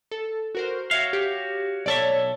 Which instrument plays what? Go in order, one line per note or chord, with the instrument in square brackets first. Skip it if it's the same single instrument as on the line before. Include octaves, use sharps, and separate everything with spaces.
[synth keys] A4
F#4 A#4 C5
[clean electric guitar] F#4 C#5 F5 [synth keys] E5
[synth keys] G4
[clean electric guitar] B1 A4 E5 [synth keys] C#5 D5